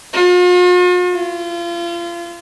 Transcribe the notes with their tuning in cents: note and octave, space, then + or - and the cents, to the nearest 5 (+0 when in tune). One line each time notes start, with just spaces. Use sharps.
F4 +45
F4 -30